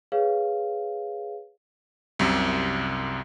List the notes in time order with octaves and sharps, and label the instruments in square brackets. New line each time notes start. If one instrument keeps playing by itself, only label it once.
[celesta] G#4 B4 C#5 F5
[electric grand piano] C2 F#2 C3